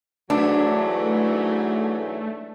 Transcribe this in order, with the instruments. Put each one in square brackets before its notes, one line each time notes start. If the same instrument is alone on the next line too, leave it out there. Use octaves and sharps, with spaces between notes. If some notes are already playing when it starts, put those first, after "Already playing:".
[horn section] G#2 E3 F#3 [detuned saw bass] A3 [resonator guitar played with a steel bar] D4